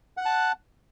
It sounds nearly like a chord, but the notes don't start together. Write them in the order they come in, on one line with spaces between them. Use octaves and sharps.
F#5 F#6 A5